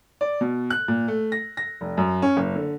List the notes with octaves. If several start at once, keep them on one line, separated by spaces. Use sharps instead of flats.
D5
B2
F#6
A#2
A3
A#6
A#6
F1
F#2
C#4
F#1
D3